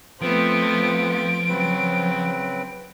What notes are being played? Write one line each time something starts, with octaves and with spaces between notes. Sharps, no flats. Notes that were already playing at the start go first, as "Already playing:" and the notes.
F3 A3 B3 C4 D7
C#3 F#3 C4 B4